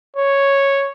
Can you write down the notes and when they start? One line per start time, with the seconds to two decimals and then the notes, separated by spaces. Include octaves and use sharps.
0.16 C#5